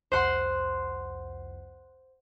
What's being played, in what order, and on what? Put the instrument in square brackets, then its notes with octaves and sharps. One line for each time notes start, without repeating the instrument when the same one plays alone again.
[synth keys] C2 F2 [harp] C5 F#5 C6